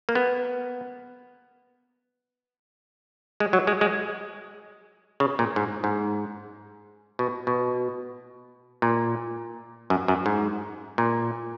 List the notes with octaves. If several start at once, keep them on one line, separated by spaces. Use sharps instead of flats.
A#3
B3
G#3
F#3
G#3
G#3
C#3
A#2
G#2
G#2
B2
B2
A#2
F#2
F#2
G#2
A#2